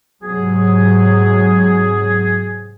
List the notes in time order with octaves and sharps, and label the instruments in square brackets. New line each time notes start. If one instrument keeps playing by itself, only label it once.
[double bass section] G#2 C3 F#3 [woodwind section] G#4